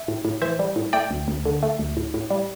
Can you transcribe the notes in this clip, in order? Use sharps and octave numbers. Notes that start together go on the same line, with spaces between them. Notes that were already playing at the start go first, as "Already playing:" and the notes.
Already playing: E5
A2
A2
E3 C5 E5
G3
A2
A3 D5 G5
D2
D2
D3
A3
D2
A2
A2
G3